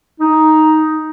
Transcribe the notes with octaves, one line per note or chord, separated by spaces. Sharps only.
D#4